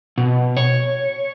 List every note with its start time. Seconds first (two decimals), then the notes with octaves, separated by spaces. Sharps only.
0.18 B2
0.57 C#5